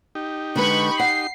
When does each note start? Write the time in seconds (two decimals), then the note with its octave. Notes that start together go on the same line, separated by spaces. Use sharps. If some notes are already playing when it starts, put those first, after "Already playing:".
0.15 D#4 G4
0.56 D3 G#3 B4 B5 C#6
1.00 F#5 C7